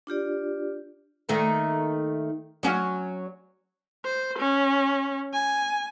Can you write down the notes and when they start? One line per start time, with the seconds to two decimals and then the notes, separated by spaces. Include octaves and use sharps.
0.07 D4 F4 G4 D5
1.29 D#3 A3 A#3
2.63 F#3 C#4 F#4
4.05 C5
4.39 C#4
5.33 G#5